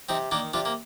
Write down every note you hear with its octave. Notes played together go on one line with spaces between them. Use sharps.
C3 C4 D#4
D#3 A#3 D4
C3 D4 F4
A#3